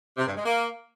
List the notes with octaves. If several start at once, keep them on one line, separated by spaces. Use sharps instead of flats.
C3
G2
G#3
A#3